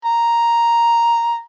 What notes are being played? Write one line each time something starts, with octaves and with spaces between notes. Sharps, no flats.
A#5